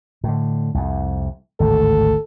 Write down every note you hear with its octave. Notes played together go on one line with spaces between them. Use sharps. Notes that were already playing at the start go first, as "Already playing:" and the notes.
A2 D3
C2 F2
G#1 D2 A2 A4